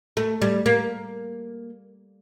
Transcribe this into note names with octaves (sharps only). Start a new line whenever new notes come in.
A3
G3
A#3